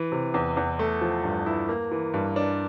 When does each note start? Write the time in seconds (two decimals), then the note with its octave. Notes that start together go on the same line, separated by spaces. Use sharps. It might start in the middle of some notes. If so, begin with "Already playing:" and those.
Already playing: E3
0.12 C3
0.34 E2
0.57 E2
0.79 A3
1.01 F3
1.24 G2
1.46 E4
1.69 A#3
1.91 E3
2.14 G2
2.36 D4